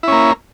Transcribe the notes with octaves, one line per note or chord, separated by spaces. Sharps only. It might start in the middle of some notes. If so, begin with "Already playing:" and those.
A#3 C#4 E4